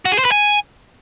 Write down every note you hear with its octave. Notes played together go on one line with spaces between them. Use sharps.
F#4
G#4
C5
B4
G#5